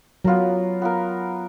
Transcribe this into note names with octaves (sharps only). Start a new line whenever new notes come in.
F#3 B3 F4 A#4
B3 F4 A#4